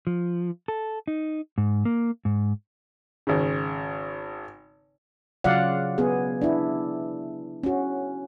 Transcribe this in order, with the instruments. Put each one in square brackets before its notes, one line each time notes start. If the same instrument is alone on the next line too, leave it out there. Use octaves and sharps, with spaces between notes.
[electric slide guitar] F3
A4
D#4
G#2
A#3
G#2
[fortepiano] G#1 C#3
[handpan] C#3 F#3 F4 D5 F5 F#5
B3 G#4
D4 E4
C#4 F#4